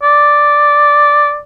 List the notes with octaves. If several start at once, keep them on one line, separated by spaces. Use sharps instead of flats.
D5